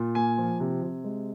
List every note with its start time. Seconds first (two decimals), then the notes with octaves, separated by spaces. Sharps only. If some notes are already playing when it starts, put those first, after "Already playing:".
Already playing: A#2
0.15 A#3 G#5
0.38 F3
0.60 C3
0.83 C3
1.04 G#3